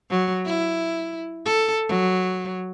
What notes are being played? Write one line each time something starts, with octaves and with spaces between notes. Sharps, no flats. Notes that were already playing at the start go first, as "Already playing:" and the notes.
F#3
E4
A4
F#3